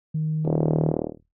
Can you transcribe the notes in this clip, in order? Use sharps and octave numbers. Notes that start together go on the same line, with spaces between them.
D#3
D#1